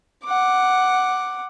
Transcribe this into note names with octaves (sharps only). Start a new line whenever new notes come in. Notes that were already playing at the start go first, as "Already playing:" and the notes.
F#5 D6